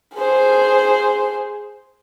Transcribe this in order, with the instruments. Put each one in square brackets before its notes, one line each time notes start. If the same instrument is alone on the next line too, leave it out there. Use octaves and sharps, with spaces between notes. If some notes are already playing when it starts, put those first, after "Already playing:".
[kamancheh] G#4 C5